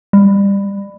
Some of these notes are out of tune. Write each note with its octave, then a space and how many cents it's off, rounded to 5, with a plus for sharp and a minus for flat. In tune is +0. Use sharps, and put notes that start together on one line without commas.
G3 +25